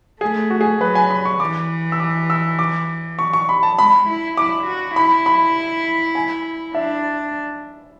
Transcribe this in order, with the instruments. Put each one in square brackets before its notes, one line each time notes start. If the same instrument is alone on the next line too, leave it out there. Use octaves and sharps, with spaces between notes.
[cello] A3 [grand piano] G#4
[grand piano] F#4
G#4
[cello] F#3 [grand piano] B4
[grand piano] G#5
B5
C#6
[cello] E3 [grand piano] D6
[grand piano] E6
D6
E6
D6
C#6
C#6
B5
A5
[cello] G#3 [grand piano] B5
[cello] E4
[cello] E4 [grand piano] D6
[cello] F#4
[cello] E4 [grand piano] B5
[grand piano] B5
G#5
[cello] D4 [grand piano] E5